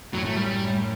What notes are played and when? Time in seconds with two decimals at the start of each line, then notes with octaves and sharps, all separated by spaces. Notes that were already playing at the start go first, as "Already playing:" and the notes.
0.13 F#2 A2 F#3
0.25 A3
0.36 G3